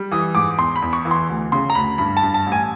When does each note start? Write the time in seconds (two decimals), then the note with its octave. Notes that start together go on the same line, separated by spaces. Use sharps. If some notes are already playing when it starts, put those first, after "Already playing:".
Already playing: G3
0.11 E3 D#6
0.35 G#2 D6
0.58 E2 C6
0.76 B5
0.82 E2
0.93 C#6
1.05 E3
1.11 C6
1.29 D2
1.52 C#3 C6
1.70 A#5
1.75 D2 B5
1.98 G2 B5
2.17 A5
2.23 G2
2.34 A5
2.46 A1
2.52 G#5